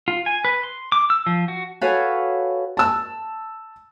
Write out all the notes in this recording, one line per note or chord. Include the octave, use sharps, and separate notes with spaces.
F4
G#5
B4
C6
D6
E6
F3
F#4
F#4 A4 B4 C#5 F5 G#5
A5 E6